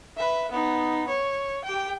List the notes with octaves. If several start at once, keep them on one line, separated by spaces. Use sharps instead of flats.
B4 E5
B3 D#4
C#5
G4 G5